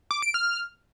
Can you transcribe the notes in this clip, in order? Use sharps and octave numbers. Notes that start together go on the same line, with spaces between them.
D6
D7
F6